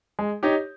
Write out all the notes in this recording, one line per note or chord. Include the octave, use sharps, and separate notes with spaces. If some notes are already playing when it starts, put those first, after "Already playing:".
G#3
D#4 G4 C#5